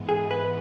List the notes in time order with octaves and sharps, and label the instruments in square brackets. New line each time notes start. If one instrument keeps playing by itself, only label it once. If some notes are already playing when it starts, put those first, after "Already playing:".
Already playing: [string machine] G#2 E3 G#3 B3
[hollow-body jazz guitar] G#4
B4